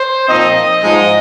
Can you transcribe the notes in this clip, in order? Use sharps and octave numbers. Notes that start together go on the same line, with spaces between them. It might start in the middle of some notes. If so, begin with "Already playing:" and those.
Already playing: C5
A#2 F3 C4 D#4 D#5
G#2 F3 G#3 D#4